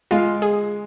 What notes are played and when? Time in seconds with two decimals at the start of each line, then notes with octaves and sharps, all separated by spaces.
0.11 G#3 F4
0.42 G#4